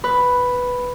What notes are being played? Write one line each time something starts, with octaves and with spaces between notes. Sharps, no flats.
B4